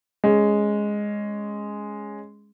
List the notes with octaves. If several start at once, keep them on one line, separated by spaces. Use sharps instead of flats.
G#3 C#4